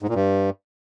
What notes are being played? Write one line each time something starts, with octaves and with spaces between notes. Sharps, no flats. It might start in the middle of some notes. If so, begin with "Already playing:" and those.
G#2
A#2
G2